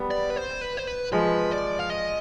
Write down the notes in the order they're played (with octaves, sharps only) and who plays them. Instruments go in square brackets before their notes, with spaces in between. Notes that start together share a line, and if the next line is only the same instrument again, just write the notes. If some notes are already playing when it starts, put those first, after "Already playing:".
Already playing: [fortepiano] G3 B3
[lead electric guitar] D5
B4
C5
B4
C5
B4
[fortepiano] F3 G#3 [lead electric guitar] B4
[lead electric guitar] D5
F5
D#5